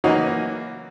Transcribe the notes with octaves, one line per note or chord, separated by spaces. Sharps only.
E3 F#3 A#3 C#4 D#4 F#4